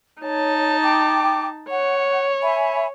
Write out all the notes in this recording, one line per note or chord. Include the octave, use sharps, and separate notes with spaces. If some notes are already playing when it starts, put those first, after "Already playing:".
D#4 C#5 A5
G5 D6
C#5 F#5
E5 G#5 B5